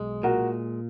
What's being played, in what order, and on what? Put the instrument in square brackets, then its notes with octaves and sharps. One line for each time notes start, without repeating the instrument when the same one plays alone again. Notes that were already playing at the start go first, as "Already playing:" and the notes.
Already playing: [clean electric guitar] B1 G#3
[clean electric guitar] A#2 [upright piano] F#4 A#4